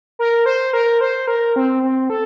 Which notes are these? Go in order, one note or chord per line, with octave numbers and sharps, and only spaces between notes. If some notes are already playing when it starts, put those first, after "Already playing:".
A#4
C5
A#4
C5
A#4
C4
C4
A4